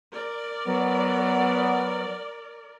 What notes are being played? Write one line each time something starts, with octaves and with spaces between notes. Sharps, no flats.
A#4 D5
F#3 B3